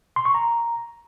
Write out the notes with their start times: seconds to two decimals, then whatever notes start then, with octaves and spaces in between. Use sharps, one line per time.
0.16 C6
0.25 C#6
0.34 A#5